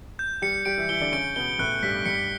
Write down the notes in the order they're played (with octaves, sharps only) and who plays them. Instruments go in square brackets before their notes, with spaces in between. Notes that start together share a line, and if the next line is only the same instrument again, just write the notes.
[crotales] G6
[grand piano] G3 G4 [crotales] C#7
[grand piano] G3 G4 [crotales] D7
[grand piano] E3 E4
[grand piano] E3 E4 [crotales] G7
[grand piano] D3 D4
[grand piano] C#3 C#4 [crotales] D7
[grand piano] B2 B3 [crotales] G7
[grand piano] A2 A3 [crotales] F#6
[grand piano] G2 G3 [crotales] B6
[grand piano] G2 G3 [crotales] C#7